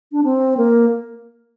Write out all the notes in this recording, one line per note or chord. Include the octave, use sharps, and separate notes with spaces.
D4
C4
A#3